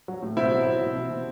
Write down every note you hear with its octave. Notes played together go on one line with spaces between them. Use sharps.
F#3
A2
B2 C4 E4
F#3
F#3
B2
B2
B2